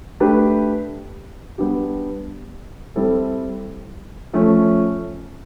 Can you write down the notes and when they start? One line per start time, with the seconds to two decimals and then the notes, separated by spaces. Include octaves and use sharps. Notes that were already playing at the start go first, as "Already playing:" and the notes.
0.20 A3 D4 G4 B4
1.58 G3 B3 D4 G4
2.96 G3 C4 E4 A4
4.33 F3 A3 C#4